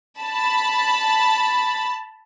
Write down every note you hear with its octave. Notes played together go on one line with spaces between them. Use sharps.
A5 B5